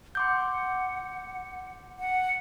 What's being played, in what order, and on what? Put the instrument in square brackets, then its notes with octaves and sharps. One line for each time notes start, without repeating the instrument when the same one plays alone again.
[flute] F#5 [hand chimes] C6 D6 G6
[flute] F#5